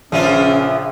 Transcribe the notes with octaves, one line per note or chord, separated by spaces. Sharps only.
A#1 C#3 F3 B3 C#4 E5